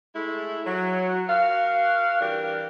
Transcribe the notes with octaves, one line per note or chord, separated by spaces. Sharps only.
G#3 A3 E4
F#3
F#4 A#4 F5
E3 G3 D4 G4 A#4